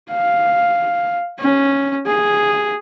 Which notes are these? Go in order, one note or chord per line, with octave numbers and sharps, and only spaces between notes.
F5
C#4
G#4